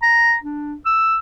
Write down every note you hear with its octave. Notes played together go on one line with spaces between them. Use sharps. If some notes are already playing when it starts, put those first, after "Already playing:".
A#5
D4
E6